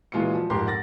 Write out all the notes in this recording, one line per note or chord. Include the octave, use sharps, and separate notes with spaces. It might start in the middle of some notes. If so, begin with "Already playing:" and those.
A#2 E3 G#3 F4 F#4 C#7
F3
F2 G#2 G4 A#4 C6
F#5 A6 A#6